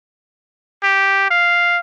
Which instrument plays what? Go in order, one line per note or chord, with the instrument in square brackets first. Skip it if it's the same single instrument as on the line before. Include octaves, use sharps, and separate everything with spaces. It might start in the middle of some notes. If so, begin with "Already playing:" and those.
[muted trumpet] G4
F5